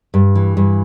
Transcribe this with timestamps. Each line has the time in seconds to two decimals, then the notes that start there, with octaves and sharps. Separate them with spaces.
0.14 G2
0.35 E3
0.57 G2